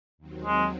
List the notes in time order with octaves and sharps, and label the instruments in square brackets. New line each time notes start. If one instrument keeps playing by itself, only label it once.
[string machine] D#2 D#3 F#3 C4
[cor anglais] G#3